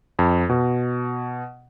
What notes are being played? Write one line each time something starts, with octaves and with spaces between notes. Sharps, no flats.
F2
B2